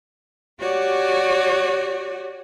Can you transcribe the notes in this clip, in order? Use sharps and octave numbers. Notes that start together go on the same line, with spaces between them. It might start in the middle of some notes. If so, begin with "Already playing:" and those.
F#4 G4 C#5 D5